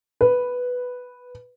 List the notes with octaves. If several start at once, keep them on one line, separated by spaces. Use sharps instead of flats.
B4